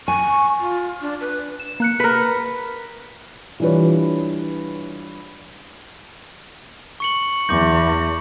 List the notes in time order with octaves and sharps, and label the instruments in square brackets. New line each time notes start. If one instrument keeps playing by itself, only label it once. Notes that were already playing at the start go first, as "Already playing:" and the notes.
[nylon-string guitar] G#5 [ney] C#6
[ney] F4
D4
B4
[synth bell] E7
A#3 F#6 C#7
[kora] A#4 B4 [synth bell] B6
[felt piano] E3 G3 D4 F4 B4 C#5
[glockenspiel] C#6 C#7 F#7
[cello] E2 [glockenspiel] D6 G6